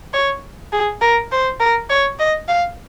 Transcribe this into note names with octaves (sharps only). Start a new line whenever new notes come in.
C#5
G#4
A#4
C5
A#4
C#5
D#5
F5